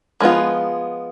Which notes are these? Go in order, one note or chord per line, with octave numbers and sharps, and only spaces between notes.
F3 G#3 B3 F4